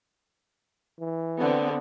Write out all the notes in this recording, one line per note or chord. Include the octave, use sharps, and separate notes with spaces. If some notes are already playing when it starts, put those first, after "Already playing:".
E3
D3 B3 C4